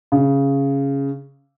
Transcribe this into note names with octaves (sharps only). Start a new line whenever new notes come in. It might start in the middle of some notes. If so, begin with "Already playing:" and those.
C#3